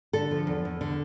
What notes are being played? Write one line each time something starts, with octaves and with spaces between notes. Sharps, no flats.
D3 A4
F3
E2
E2
D3